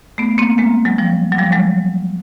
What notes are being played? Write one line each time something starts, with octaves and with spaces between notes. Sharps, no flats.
A3 B3
A#3 C4
G#3 A#3
F#3 G#3
F3 G3
F#3
F3 G3
F#3 G#3